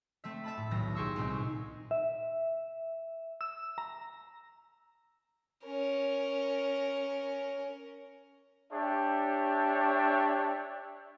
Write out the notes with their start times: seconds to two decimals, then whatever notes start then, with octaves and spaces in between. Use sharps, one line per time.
0.24 A3 C4 E5
0.44 E5 A5 B5
0.57 A2
0.71 D#1 B1 A#6
0.95 G4 G#4 C6 C#6 E6
1.16 C2 A#2 C4 D#4
1.91 E5
3.41 E6
3.78 A#5
5.66 C#4 A#4
8.73 D4 G4 C#5 E5